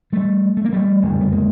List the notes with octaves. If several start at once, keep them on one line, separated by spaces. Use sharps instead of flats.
G3 A3
A3
A#3
G3 A3
F#1 F2 D3 G3 A3
B3
G#3 A#3